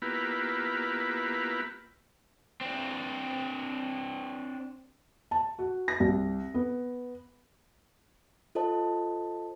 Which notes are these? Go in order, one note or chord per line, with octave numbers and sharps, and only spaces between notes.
A#3 B3 E4 F4 G4 B4
C4 D4
A5
F#4
A#6
C2
B3
F4 A4 C5 D#5 A5